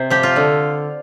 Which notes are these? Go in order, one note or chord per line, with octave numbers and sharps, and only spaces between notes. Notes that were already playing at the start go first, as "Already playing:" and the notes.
Already playing: C3 C5
F3 G4
F4
D3